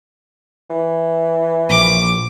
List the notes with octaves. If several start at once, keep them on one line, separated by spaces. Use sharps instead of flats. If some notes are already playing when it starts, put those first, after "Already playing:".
E3
A#1 D6